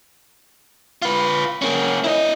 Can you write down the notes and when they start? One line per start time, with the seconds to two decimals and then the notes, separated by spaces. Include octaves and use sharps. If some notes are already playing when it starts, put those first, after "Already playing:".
1.02 F4 B4
1.62 A#3 C#4
2.04 E4 D#5